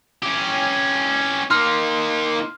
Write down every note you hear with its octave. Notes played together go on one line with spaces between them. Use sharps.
C#4 G4
A#3 D#4 C6 F6